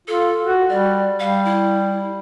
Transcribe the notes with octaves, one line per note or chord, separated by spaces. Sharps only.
F4 A4
F#4
G3 D5
G3 F5
E4